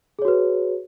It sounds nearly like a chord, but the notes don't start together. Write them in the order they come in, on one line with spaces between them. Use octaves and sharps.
G#4 C#5 F#4 B4